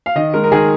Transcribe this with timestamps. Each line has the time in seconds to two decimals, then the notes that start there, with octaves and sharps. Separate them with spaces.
0.06 F5
0.16 D#3 D#5
0.33 G#3 D#4 A#4
0.44 A#4
0.51 D#3 G#4